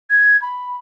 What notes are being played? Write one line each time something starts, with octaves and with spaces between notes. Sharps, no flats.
G#6
B5